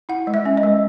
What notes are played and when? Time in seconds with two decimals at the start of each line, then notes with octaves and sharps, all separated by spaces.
0.09 E4 F#5
0.27 G#3
0.34 E5
0.45 C#4
0.57 D#5
0.63 G#3